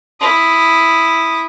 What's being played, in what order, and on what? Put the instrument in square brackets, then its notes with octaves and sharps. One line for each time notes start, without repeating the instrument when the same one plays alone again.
[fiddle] E4 D#6